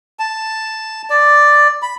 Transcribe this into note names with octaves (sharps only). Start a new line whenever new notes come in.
A5
D5
B5